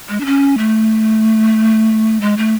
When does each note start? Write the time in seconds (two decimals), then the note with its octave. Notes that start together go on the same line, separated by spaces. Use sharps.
0.09 G#3
0.20 D4
0.25 C#4
0.58 A3
2.21 G#3
2.37 A3